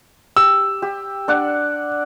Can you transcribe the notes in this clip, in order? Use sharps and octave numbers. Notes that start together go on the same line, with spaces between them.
G4 E6
G4
D4 D5 F#5